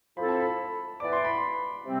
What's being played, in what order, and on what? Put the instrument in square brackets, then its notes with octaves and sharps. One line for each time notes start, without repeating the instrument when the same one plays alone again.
[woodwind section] F3 C4 E4 A4 C5 [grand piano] B5
[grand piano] A5
B5
[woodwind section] E3 B3 E4 B4 D5 [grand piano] D6
[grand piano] C6
B5
C6
[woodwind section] C3 G3 C4